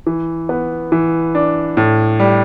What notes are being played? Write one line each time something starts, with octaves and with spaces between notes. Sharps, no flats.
E3
B3
E3
D4
A2
G3